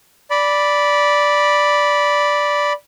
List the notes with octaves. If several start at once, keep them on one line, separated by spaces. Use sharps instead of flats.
D5 B5